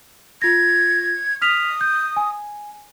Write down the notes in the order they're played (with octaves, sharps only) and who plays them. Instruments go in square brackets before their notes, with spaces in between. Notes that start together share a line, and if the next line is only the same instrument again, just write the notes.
[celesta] F4 A#6 [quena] G#6
[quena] D#6 [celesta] F6 B6 F7
[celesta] G6
G#5